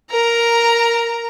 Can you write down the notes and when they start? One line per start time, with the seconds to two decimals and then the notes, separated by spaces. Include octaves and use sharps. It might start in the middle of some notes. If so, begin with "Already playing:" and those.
0.10 A#4 A#5